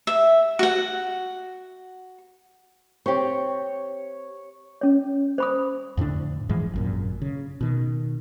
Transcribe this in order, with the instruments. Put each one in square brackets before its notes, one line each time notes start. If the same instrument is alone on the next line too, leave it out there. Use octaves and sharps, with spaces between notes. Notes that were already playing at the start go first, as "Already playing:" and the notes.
[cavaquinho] E5
F#4 F#5
[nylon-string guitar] C4 G4 [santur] C#5
[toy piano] C#4 C#5
C5 B5 D#6
[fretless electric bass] F2 A2 D3 D4
G#2 E3 F3 G#3
G#1 F#2 A#2
C#3
B2 D#3